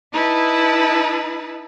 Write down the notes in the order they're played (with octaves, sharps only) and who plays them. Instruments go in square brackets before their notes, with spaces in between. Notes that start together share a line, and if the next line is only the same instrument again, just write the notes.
[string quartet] D#4 E4 B4 A5